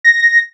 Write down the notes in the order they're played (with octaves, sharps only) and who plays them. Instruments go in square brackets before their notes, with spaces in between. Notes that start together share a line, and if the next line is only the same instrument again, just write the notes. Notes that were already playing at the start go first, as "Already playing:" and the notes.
[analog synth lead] A#6